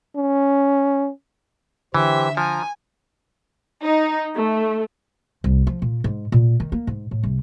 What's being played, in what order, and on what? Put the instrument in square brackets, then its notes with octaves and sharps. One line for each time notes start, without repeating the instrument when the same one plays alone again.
[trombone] C#4
[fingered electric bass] D3 [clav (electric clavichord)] E3 [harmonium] G4 C5 [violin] E5
[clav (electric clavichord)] F3 [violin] G#5 [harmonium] A#5
[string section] D#4
A3
[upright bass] C2
F3
A#2
G#2
A#2
D#3
A#3
G#2
A2
C2